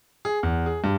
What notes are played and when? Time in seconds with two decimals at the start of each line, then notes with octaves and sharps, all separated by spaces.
0.25 G#4
0.43 E2
0.66 G#4
0.84 G2